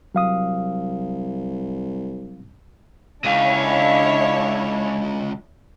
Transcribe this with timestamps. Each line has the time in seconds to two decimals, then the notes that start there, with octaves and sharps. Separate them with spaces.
0.15 C2 F#3 F5 D#6
3.24 C#2 C#3 D4 E4 C#5 D#5 F5